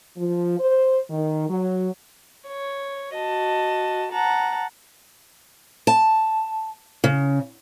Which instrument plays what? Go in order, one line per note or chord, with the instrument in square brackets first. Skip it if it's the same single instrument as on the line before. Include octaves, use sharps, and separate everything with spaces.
[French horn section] F3
C5
D#3
F#3
[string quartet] C#5
F#4 D#5 A5
F#5 A5 A#5
[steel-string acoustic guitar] A5
C#3